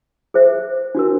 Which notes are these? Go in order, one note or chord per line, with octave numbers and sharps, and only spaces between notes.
G#4 C5 E5
D4 F#4 A#4